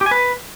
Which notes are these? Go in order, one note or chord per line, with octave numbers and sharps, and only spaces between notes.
G4
G#5
B4